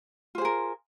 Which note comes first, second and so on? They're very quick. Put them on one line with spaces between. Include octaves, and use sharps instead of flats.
F4 C5 G#4 A#4